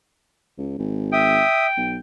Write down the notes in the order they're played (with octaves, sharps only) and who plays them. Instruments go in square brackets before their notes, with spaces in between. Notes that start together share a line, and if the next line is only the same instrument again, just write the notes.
[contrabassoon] C#2
G#1
[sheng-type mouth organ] E5 D#6 [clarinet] G5
[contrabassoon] B1